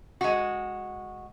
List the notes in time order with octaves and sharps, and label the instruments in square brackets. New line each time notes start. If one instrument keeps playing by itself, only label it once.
[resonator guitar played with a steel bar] G#3 F#4